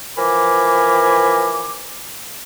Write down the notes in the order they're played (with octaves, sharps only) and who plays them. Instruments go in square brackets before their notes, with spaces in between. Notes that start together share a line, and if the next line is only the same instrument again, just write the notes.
[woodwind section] E3 F3 A#4 G#5 B5 D6